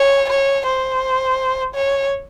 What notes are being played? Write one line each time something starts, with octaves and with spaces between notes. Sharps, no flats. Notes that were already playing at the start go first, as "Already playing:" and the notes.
Already playing: C#5
C#5
C5
C#5